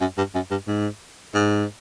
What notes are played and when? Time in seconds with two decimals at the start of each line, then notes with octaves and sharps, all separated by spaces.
0.01 F#2
0.18 G2
0.35 F#2
0.51 G2
0.67 G#2
1.34 G#2